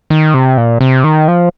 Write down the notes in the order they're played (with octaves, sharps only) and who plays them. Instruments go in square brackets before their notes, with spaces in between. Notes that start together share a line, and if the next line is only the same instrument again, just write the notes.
[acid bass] D#3
C3
A#2
C3
D#3
F3